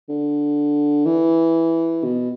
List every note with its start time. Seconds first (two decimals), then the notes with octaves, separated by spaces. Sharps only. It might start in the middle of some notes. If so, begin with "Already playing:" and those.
0.09 D3
1.05 E3
2.04 B2